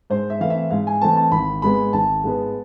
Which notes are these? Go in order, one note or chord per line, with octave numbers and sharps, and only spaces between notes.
G#2 C5
E5
E3 A3 C4 F5
E5
G#2 F5
G#5
E3 A3 C4 A5
A5
G#1 B5
G#2 G#3 B3 B5
G#1 A5
G#2 G#3 B3